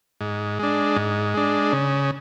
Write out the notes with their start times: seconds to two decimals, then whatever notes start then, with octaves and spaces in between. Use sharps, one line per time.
0.21 G#2
0.59 G#3 D4
0.96 G#2
1.34 G#3 D4
1.73 C#3